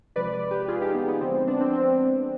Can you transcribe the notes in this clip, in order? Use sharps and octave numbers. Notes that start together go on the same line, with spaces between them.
C3 F3 G#3 B4 D5
B4 D5
G4 B4
F4 G#4
D#4 G4
B3
B3
D3 F3 G#3 C4
C4
B3 D4
C4
C4